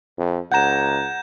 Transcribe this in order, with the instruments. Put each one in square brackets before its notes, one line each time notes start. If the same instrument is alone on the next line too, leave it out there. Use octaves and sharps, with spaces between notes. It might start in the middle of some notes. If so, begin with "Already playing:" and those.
[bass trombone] F2
[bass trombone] C#2 [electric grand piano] F#5 A#5 [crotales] G6 G#6 E7